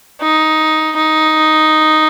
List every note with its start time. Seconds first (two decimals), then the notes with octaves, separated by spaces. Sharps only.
0.21 D#4
0.97 D#4